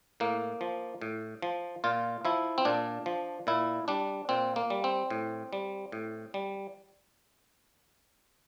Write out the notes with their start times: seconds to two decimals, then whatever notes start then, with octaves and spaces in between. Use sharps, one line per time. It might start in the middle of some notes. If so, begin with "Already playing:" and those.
0.20 A2 A#3
0.61 F3
1.02 A2
1.42 F3
1.84 A#2 F4
2.25 F3 E4
2.58 C4
2.65 A#2 D4
3.06 F3
3.47 A#2 E4
3.88 G3 D4
4.29 A#2 C4
4.56 A#3
4.70 G3
4.84 C4
5.10 A2
5.53 G3
5.92 A2
6.34 G3